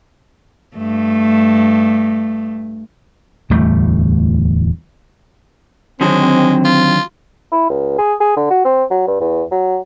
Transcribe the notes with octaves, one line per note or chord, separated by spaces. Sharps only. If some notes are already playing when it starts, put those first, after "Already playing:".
G2 A3
D1 E2 G3 A3
D3 D#3 F#3 G#3 C4
F4
E4
C#2
G#4
G#4
D3
F#4
C4
F#3
G2
E2
F#3